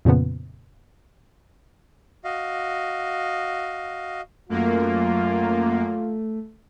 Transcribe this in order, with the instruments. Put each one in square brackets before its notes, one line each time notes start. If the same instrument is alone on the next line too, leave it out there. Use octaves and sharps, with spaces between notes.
[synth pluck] F2 A#2 C#3 F3 B3
[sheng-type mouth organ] F#4 D#5 F5
[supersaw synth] F#2 A#3 [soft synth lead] A3 [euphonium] F4